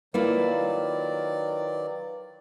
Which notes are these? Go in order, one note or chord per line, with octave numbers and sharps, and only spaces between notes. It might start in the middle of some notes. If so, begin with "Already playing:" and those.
D#3 F#3 A#3 E4 F4 B4 D5 F5